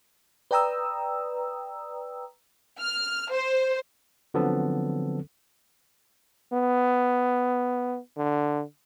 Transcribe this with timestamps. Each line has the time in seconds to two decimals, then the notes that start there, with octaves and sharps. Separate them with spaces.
0.51 B4 D5 G5 A#5 D#6 E6
2.78 F6
3.31 C5
4.34 D3 F3 F#3 B3 C4 A4
6.53 B3
8.17 D3